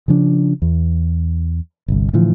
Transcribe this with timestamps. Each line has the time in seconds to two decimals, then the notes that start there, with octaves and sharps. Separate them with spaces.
0.08 C#3 F3 D4
0.62 E2
1.88 G1 C2
2.13 A2 D3 E3 F3